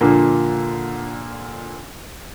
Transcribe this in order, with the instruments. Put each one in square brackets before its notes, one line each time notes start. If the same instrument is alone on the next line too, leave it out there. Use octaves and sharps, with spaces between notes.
[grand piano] A#2 D3 F3 A#3